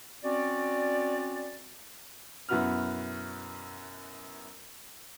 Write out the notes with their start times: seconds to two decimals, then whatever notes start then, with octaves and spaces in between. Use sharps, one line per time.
0.24 C4 C#4 F#4 D5
2.49 F#2 B2 E4 F#4 B4 F6